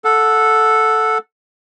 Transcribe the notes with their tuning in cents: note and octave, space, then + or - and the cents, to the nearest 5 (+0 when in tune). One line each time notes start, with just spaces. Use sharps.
A4 +0 F#5 -20